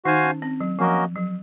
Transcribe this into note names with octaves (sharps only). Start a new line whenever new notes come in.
D#3 D#4 F#4 C5 F5 G#5
C#4
C4
F#3
F3 A#3 C#4 F#4 A#4 D#5
F#3